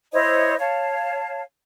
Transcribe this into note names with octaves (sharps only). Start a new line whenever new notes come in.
E4 C5 C#5 D#5
C#5 F5 A5